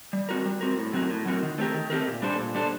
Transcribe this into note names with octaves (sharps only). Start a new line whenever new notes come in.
G3
C4 F#4 A#4
G3
C4 F#4 A#4
A2
F#3 C4 F#4 A#4
A2
F#3 C4 F#4 A#4
D#3
A3 C4 G4 A#4
D#3
A3 C4 G4 A#4
A#2
G3 D4 A4 C5
A#2
G3 D4 A4 C5